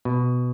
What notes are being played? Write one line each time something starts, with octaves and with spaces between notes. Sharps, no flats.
B2